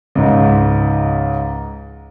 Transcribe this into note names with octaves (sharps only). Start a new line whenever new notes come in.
C#2 G#2